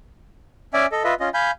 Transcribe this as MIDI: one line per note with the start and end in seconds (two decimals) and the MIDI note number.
0.74 0.86 61
0.74 0.86 74
0.74 0.86 76
0.74 0.86 80
0.92 1.03 69
0.92 1.03 75
1.04 1.14 65
1.04 1.14 71
1.04 1.14 75
1.04 1.14 76
1.20 1.29 61
1.20 1.29 65
1.20 1.29 75
1.34 1.51 77
1.34 1.51 80
1.34 1.51 83
1.34 1.51 91